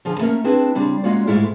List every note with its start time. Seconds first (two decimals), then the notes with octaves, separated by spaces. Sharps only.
0.05 D3 F3 G#4 G#5
0.18 D3 A3 A#3 C#4 A#4
0.44 C4 D4 E4 G#4 B4
0.75 C#3 G3 C4 D4
1.04 G#3 A#3 C#4 F4 F#4 D5
1.27 G#2 G#3 A3 E4 F4